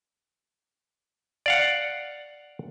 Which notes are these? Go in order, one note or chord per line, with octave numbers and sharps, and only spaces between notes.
D5 F5 F#5